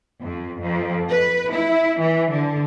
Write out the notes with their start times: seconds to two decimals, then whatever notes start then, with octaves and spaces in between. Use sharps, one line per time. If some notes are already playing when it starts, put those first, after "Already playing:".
0.22 F2
0.60 F2
1.09 B4
1.52 E4
1.99 E3
2.31 D3